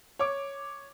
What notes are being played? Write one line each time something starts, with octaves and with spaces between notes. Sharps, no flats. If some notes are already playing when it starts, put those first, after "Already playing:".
C#5 D6